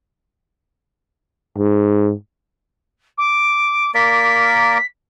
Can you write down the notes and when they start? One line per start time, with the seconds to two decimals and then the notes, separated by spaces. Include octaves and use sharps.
1.58 G#2
3.18 D6
3.94 A#3 A#4 D5 B6